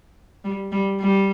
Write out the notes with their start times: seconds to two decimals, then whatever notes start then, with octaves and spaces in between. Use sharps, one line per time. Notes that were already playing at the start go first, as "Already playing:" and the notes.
0.44 G3
0.72 G3
1.01 G3